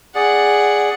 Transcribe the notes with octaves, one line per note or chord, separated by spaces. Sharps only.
G#4 D5 F#5